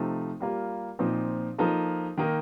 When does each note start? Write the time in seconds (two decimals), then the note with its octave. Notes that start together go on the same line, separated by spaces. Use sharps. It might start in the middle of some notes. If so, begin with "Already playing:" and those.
Already playing: C3 F3 A3 D#4
0.40 G3 A#3 F4
0.99 A#2 F3 C4 D#4
1.58 F3 A#3 D#4 A4
2.17 D#3 A#3 D#4 A#4